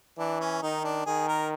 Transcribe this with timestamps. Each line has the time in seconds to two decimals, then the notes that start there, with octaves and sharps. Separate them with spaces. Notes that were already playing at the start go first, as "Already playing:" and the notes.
0.18 E3 D4
0.41 C#4
0.63 D#3 D#4
0.84 D4
1.06 D#3 G#4
1.29 A#4